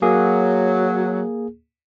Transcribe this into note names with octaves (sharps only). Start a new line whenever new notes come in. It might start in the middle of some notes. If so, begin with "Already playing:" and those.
F#3 A#3 G#4